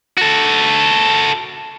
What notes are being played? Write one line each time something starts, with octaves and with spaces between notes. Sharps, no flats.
F#4 A4